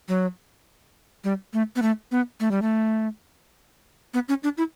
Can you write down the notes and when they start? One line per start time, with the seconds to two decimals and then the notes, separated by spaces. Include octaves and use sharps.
0.09 F#3
1.24 G3
1.53 A3
1.76 B3
1.82 A3
2.12 B3
2.40 A3
2.51 G3
2.62 A3
4.14 B3
4.29 C#4
4.43 D4
4.58 E4